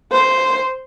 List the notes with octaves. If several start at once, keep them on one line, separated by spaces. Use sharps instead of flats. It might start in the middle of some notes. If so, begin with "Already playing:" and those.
C5